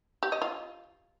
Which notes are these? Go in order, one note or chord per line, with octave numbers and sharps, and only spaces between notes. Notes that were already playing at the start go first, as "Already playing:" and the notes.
G4
D#5
F4